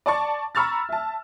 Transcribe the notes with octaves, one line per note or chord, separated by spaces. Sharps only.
D5 A5 C#6
A#5 B5 C#6 E6 F6 A6
E5 A5